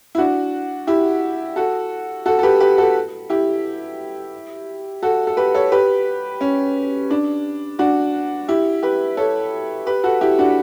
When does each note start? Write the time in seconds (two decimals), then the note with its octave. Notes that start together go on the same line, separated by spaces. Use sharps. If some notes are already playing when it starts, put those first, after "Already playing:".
0.15 E4
0.18 D4 F#4
0.87 E4 G4
1.56 F#4 A4
2.26 F#4 A4
2.39 A4
2.43 G4 B4
2.60 G4 B4
2.78 F#4 A4
3.30 E4 G4
5.03 F#4 A4
5.27 A4
5.37 G4 B4
5.55 A4 C#5
5.72 G4 B4
6.41 C#4
7.11 D4
7.79 D4 F#4
8.48 E4 G4
8.83 G4 B4
9.17 A4 C#5
9.87 G4 B4
10.04 F#4 A4
10.21 E4 G4
10.39 D4 F#4